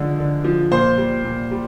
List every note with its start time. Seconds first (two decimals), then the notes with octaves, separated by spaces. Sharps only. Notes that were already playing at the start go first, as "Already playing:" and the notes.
Already playing: D3 F3 G#3
0.19 D3
0.44 F3
0.72 A#2 C5 C6
0.98 G3
1.25 A#2
1.51 G3